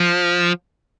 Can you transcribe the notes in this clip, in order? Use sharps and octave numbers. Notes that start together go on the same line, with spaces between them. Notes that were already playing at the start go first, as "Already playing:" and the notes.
Already playing: F3